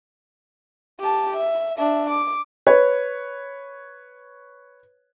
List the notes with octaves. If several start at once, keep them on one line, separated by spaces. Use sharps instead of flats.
G4 A5
E5
D4 E5
D6
B4 C#5